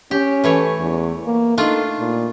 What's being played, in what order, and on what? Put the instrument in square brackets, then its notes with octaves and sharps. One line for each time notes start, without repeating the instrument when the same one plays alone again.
[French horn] C#4 [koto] G4
[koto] E3 A3 C#5
[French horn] E2
A#3
[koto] A3 D4 F4 [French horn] D#4
[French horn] A#2